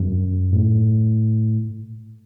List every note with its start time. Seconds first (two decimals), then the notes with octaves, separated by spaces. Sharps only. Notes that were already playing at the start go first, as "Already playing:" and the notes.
Already playing: F#2
0.52 A2